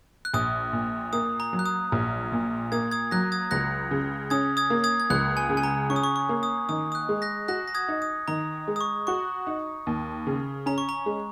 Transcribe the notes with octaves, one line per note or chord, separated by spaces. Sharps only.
F#6
A#1 D#6
A#2
A#3 D#6
A#5
F#3
F#6
D#6
A#1
A#2
A#3 D#6 G#6
D#6 G#6
F#3 F#6 A#6
D#6 G#6
C#2 F#6 A#6
C#3
C#4 D#6 G#6
D#6 G#6
A#3
D#6 G#6
G#6
C#2 F#6
G#5
C#3
G#5
A#5
C#4 C#6
D#6
C#6
C#6
A#3
D#6
D#3 D#6
D#6
F#6
G#3
F#6 A#6
F#4 F#6 A#6
A#6
D#6 G#6
D#4
D#6
D#3 A#5
G#3
D#6
C#6
F#4 C#6
D#4
D#2
C#3
C#4 A#5
C#6
A#5
G#3